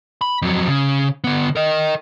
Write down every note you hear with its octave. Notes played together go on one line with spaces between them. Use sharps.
B5
F2 F#3
C#3
D3 B3
A#4 D#5